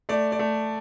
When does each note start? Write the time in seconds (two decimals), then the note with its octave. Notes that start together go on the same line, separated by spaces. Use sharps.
0.09 A3 D5
0.32 D5
0.39 A3